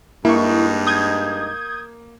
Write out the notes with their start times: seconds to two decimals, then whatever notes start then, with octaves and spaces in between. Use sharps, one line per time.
0.25 G2 G#3 A#3 D#4 E4 C#6
0.87 D#6 G6 G#6